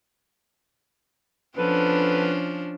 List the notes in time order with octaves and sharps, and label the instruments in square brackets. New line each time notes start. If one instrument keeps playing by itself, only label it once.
[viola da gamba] F3 C#4 D4 [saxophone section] B3 A4 B4